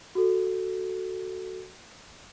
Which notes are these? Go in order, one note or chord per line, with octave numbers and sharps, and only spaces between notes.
F#4 A4